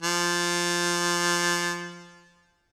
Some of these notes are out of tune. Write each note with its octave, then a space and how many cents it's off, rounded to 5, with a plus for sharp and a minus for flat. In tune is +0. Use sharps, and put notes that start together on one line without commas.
F3 -5